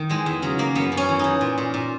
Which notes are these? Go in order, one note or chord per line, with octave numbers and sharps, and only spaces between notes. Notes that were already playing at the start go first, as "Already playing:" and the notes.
Already playing: D#3
E3 G#3
E2
C#3 F#3
E2 A#3
F#2 B3
F#2
C#4
E3
E3 D#4
A#2
A#2
A#2